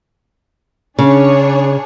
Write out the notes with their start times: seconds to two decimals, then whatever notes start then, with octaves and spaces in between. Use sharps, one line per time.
0.99 C#3 D4 G#4 C#5